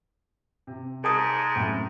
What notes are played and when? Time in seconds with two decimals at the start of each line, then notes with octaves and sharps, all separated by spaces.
0.67 C3
1.04 G#2 G#4 A5 D#6
1.56 F#2 A2 C3